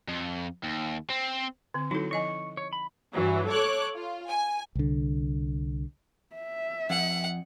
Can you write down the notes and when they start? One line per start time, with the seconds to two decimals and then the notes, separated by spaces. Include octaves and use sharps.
0.08 F2
0.64 D#2
1.10 C4
1.74 D3 C4
1.91 F#3 D#4 E4 A4
2.11 F3 D#5 G#5 C#6
2.57 C#5
2.73 B5
3.13 G2 E3 F#3
3.48 A4 C#5 D6 F#6
3.95 F4
4.28 G#5
4.75 C2 D3
6.36 E5
6.90 F2 F#5